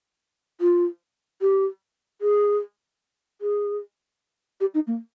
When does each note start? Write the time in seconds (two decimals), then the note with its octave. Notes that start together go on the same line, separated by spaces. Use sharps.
0.61 F4
1.42 G4
2.21 G#4
3.41 G#4
4.61 G4
4.74 D#4
4.87 A#3